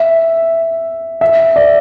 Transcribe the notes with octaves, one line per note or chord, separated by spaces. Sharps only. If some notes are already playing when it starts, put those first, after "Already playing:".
Already playing: E5
E5
D5